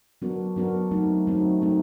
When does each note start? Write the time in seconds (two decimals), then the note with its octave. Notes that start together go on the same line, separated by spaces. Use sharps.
0.22 F#3 B3 D4 F#4 A#4
0.56 F#3 B3 D4 F#4 A#4
0.91 F#3 A3 C4 D#4
1.27 F#3 A3 C4 D#4
1.62 F#3 A3 C4 D#4